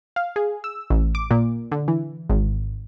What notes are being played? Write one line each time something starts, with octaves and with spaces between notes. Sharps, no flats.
F5
G#4
E6
A1
D6
A#2
D3
E3
G#1